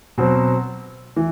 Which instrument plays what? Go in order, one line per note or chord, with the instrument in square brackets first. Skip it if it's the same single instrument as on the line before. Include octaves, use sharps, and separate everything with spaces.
[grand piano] B2 F#3 C4
E3